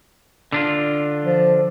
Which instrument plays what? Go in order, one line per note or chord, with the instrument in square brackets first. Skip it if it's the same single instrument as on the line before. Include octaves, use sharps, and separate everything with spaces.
[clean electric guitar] D3 D4 F4
[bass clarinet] F3